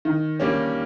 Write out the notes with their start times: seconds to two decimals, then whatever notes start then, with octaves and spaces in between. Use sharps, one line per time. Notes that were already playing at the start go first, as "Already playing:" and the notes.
0.05 D#3
0.40 G3 A#3 C#4